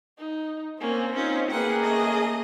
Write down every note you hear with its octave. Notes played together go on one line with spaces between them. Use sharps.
D#4
A#3 C4 C#4
C#4 D#4 F4
A#3 G#4 B4 F#5 G5
A3 C#4 D#5